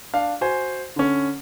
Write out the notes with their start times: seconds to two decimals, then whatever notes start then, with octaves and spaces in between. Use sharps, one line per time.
0.14 D4 F5
0.41 F#4 C5 G#5
0.96 D3 C#4